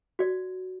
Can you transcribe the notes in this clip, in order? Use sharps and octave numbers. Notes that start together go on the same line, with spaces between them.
F#4 D5